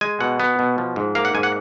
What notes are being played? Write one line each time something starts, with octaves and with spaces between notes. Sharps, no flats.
G#3 G#5
B2 F#5
B3
B2
F3
G#2
A#3 F5
F#5
G#2 G#5
F#5